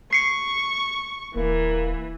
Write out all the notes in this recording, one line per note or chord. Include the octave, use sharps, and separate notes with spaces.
C#6 C7 C#7
D#1 E3 A#3